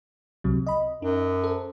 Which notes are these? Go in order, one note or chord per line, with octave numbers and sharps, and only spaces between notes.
C#2 C3 F#3
D#5 B5
F#2 D#4
A4 C5